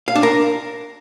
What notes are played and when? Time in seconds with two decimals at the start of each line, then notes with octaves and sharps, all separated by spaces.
0.08 F5
0.15 D4
0.23 A#4